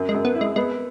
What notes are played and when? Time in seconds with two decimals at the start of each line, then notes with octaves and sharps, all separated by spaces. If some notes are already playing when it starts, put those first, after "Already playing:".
Already playing: F#2
0.09 G#3
0.14 F#2
0.25 B3
0.35 E4
0.41 G#3
0.56 G#3 B3